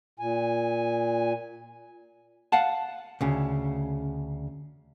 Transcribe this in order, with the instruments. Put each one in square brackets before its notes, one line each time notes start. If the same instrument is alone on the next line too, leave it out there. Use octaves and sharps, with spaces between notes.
[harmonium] A#2 G#5
[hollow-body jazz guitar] F5 F#5 A5
D2 C#3